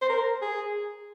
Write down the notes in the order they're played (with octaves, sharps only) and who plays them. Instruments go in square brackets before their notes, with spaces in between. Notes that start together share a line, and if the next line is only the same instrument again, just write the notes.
[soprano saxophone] C5
A#4
G#4